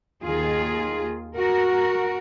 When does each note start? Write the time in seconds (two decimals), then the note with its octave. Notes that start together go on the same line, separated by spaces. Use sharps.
0.23 D#2 D#3 F4 G#4
1.36 F#4 A#4